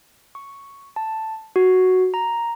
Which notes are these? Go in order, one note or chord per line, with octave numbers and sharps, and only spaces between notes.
C#6
A5
F#4
A#5